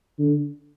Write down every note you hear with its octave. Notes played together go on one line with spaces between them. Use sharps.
D3